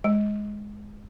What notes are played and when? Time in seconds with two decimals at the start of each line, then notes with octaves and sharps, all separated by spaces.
0.04 G#3